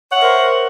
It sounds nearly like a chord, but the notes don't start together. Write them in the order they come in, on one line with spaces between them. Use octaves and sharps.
C#5 F#5 E5 A#4 C5